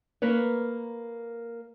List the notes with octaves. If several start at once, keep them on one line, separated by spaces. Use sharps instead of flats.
A#3 A#4 B4 C#5